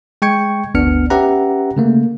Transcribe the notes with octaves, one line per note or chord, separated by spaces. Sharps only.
G#3 G5 C#6 G#6 C#7
G1 D2 B3 D4 F6 C#7
C#4 G4 B4 E5 F#5 A#5
C#3 A3 A#3